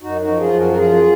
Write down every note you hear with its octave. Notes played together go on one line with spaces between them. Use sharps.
F#2 D#4 F#4
D#4 F#4
F3
F4 G#4
F#2
F#4 A#4
A#4
F3 F4 G#4